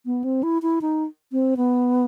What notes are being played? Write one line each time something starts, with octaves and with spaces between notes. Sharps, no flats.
B3
C4
E4
E4
D#4
C4
B3